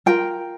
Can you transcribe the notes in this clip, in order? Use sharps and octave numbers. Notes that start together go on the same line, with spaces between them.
F4 A#4 G5